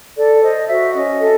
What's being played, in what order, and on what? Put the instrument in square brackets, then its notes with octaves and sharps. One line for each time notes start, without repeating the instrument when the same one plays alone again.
[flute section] A4 D5
C5 D#5
F#4 E5
C#4 D#5
A4